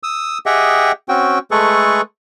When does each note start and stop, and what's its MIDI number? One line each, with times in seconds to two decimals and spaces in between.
0.03 0.38 87
0.03 0.38 88
0.46 0.92 67
0.46 0.92 68
0.46 0.92 75
0.46 0.92 76
0.46 0.92 78
0.46 0.92 79
1.09 1.39 60
1.09 1.39 61
1.09 1.39 66
1.09 1.39 79
1.51 2.01 56
1.51 2.01 57
1.51 2.01 68
1.51 2.01 69
1.51 2.01 71
1.51 2.01 85